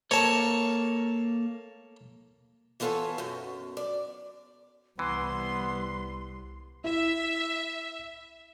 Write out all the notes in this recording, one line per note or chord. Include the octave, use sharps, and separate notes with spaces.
A#3 A4 C#5 A5
E3 B3 F4 A4 B4 C#5
F#2 B2
D5
C2 E3 B3 C6
E4 E5